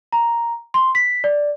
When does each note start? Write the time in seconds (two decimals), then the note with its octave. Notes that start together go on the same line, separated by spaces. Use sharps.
0.12 A#5
0.74 C6
0.95 B6
1.24 D5